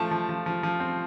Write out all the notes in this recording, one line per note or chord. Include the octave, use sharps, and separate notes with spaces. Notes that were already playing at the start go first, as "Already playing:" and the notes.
Already playing: F3 A3 A5
F3
F3
F3
F3
C4